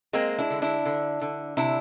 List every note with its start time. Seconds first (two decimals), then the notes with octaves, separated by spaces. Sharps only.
0.13 G#3 A#3 C4
0.38 D4 E4
0.50 D3
0.62 D4 E4
0.86 D3
1.22 D3
1.57 C3 D4 E4